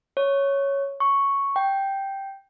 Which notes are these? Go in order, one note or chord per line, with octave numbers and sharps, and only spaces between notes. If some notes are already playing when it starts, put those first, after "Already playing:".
C#5
C#6
G5